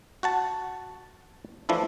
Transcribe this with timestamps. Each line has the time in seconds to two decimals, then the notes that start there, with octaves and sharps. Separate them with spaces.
0.23 F#4 F#5 A5
1.69 E3 F3 A3 D4 E4